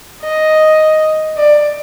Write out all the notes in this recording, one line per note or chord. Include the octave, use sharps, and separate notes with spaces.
D#5
D5